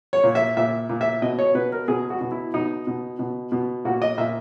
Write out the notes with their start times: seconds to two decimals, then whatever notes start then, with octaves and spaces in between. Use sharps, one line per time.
0.13 C#5
0.24 A#2
0.35 E5
0.57 A#2 E5
0.89 A#2
1.01 E5
1.22 B2 D#5
1.39 C#5
1.55 B2 B4
1.72 A#4
1.88 B2 G#4
2.10 F#4
2.21 B2
2.32 E4
2.54 B2 D#4
2.87 B2
3.19 B2
3.52 B2
3.85 A#2 F#4
4.02 D#5
4.18 A#2 E5